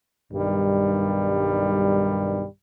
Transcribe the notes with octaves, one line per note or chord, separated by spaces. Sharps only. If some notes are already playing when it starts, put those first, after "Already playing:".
B1 G2 D#3 G3